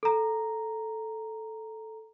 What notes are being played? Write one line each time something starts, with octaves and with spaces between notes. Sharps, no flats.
A4 A#5